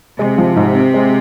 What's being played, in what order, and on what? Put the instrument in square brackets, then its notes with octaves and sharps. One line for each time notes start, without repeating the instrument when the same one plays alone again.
[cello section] C3 [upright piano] G#3
[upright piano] F3
G#2
C4
G#3